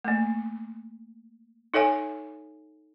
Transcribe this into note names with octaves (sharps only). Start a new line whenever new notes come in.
A3 A#3
D#4 A4 C#5 E5 G#5